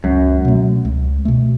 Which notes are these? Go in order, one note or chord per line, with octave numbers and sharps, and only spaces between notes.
C#2 F#2
B2 A3
C#2
B2 A3